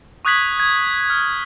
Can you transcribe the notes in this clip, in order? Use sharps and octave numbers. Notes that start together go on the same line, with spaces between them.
C#6 D#6 F#6 G#6 B6 F#7
G#6
F6